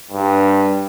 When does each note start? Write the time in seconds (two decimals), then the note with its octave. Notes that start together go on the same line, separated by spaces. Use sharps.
0.11 G2